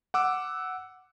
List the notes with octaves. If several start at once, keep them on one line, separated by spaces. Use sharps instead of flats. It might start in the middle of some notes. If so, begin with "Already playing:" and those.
F#5 D6 E6